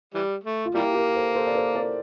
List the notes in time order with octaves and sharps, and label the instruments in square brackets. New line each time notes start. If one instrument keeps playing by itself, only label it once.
[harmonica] E3 G3
A3
[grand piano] F4
[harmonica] G3 A#3 [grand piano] E4 G4
[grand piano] G4 A#4
A4 C5
A4 C5
D5
A4 C5
A#4 D5